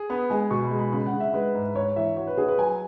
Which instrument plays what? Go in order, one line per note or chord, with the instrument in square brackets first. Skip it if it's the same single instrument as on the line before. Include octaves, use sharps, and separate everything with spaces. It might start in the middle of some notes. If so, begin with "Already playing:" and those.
Already playing: [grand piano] G#4
[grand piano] B3 [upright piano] B5
[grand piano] G#3 [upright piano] G#5
[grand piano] B2 [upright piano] C#6
[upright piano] B5
[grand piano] G#3
[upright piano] B5
[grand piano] C#3 [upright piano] B5
[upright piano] F#5
[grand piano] C#3
[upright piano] E5
[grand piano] G#3 [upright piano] B4
[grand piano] G#2
[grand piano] G#2 [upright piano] C#5
[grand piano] E3 [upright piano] E5
[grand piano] F#4 [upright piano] C#5
[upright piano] B4
[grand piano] F#4 [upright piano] G#4
[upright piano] B4
[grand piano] F#3 [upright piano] G#5